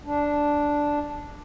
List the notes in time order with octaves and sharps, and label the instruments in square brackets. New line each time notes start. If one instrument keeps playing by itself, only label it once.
[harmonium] D4